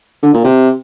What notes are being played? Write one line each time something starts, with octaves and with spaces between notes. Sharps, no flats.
D3
A#2
C3